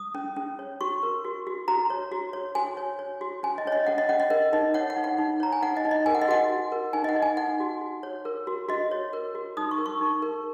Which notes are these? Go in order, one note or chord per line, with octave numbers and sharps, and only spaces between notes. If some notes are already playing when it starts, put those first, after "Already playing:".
Already playing: D#6
C#4
C#4
C#5
F#4 C#6
A#4
F#4
F#4
F#4 A#5
C#5
F#4
C#5
F#4 G#5
C#5
C#5
F#4
C#4 G#5
D#5
C#4 C#5
D#5
C#4 F#5
D#5
C#4 F#5
D#5
A#4 D#5
D#4 D#5
C#5 F#5
F#5
D#4
F#5
D#4
C#5 A#5
G#5
D#4 F#5
D#5
D#4
D#5
A#4 G#5
F#5
D#5
F#4 F#5
F#4
A#4
D#4 G#5
D#5
F#5
D#4
G#5
D#4 F#5
F#4
F#4
C#5
A#4
F#4
F#4 D#5
C#5
A#4
F#4
D#4 D#6
C#6
A#4
C#6
D#4
A#4